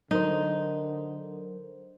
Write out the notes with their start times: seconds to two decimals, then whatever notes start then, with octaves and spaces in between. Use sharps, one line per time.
0.11 D3 F#3 D#4 A#4 C5